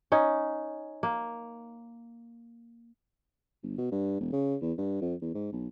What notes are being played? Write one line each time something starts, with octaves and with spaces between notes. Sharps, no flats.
C#4 D#4
A#3
G1
B2
G2
E1
C#3
E2
G2
F2
E2
G#2
B1